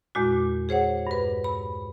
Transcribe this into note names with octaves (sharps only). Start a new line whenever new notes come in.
E2 A#2 G#3 F#4
G#4 C5 C#5 F#5
G2 B4
B5